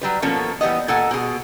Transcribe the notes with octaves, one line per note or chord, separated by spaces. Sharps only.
F#3 G3 B4
B2 F3 A#3 B3 C#4 A4
E3 G3 B3 D#5
A#2 A4 F#5 G#5
B2 G#4